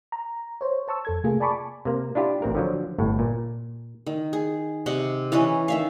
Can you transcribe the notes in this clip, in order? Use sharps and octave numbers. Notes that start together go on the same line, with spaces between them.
A#5
C5 C#5
C5 A5 C#6 E6
F2 A4 G#6
C3 A3 A#3 F4 G#4
D5 G#5 A5 B5 C#6 D6
C3 A#3
D4 E4 F4 G4
A1 C4 A#4
D3 F3 F#3
G1 A2
A#2
D#3
G#4
C3 D#5 F#5
E3 C#4 B4 D#5
D#3 E5 F5